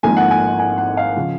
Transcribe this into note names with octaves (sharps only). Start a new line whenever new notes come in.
G#1 G#2 F3 A#3 G#5
F#5
G#5
G#5
F#5
F5
C#3 F3